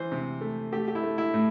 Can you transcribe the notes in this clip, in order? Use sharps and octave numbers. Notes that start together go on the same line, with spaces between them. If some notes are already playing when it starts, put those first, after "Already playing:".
Already playing: E3 C5
C3
A3
A3 G4
G4
E4
A3
E4
A2